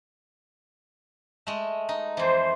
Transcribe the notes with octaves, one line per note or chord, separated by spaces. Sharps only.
G#3 A3
D#4
F2 E3 C5